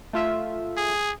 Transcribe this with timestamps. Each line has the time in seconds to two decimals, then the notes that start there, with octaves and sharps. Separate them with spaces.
0.13 A3 F4 E5
0.77 G#4